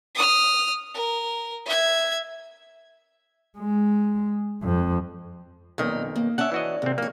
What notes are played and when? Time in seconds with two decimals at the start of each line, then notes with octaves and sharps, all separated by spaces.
0.15 D#6 F6
0.94 A#4
1.66 E5 G#6
3.58 G#3
4.63 F2
5.78 B1 F2 A#2 D#3 D#4
6.16 A#3
6.38 C#4 D5 E5 F#5 A5
6.52 E3 F#4 D#5
6.82 G#1 C3 C4
6.98 F2 A#3 C#5